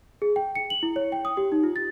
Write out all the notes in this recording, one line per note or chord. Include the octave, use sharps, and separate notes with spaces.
G#4
G5
C#7
F#7
E4
C#5
G5
D#6
G4
D#4
F4
A6